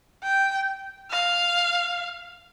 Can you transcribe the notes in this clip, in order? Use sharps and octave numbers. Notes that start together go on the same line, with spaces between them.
G5
F5